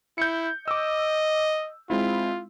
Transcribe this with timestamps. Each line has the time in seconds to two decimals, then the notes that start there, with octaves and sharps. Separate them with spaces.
0.18 E4 G6 C#7
0.68 D#5 D6 E6
1.90 G#3 C4 E4 F4